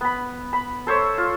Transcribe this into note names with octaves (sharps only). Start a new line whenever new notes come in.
B3 B5
B5
A4 C5 C#5 E5
F4